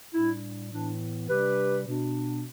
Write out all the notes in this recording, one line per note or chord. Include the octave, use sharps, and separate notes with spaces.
A2 G3 D4 E4
A2 E3 B3 D4
C3 G3 D4 G4 B4
B2 B3 D4